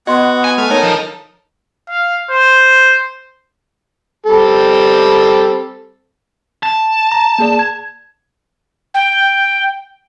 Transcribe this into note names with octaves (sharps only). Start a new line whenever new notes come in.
B3 F#4 D#5 C6
G#5
A3 F6
D#4 A4 A#4 C#5
F3
F5
C5
G3 C4 A4
A5
A#5
A#3 G#4 D5
G#6
G5